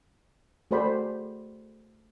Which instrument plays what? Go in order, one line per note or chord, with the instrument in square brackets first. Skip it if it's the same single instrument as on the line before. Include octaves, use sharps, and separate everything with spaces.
[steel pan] A3 F#4 G#4 C5 D5 B5